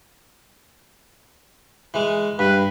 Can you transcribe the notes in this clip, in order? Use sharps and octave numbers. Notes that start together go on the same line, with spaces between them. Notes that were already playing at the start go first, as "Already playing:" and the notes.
E3 G#3
G2 B4